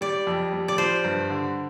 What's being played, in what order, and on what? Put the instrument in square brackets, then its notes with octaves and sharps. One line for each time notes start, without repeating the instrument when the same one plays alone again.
[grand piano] G3 [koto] D5
[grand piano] F2
G3
[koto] D5
[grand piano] F3 [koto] C5
[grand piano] G2
D3